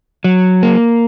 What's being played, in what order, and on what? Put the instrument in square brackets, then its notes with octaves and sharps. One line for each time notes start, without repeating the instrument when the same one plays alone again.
[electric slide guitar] F#3
A#3